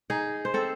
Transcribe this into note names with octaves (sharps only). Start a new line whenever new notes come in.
D#4 G#4
C5
C4 A4